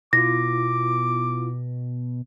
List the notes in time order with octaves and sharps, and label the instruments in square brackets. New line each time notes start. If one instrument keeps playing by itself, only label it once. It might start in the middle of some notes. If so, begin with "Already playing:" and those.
[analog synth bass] B2 [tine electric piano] E4 F4 [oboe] D6 [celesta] A#6